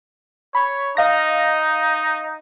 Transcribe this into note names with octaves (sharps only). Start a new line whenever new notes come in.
C#5 B5
D#4 D#5 F5 A#6